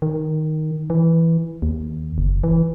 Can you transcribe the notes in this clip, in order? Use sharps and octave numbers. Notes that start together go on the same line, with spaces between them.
D#3
E3
D#2
F#1
E3